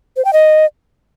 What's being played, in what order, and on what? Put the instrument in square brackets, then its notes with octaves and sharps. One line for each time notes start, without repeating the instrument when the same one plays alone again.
[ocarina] C5
G5
D#5